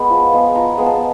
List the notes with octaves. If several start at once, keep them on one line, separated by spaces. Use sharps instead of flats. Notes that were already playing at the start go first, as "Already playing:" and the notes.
Already playing: G#3 B3 B5
F3
G#3 B3
F3 A#5
G#3 B3
A5